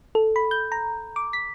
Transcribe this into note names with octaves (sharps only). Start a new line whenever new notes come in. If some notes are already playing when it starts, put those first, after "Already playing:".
A4
B5
G6
A#5
D6
B6